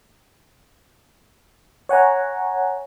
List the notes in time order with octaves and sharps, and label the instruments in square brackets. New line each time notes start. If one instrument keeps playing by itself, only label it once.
[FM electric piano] C#5 F#5 G#5 A#5